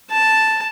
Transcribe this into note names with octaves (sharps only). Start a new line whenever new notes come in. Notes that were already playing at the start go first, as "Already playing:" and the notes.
A5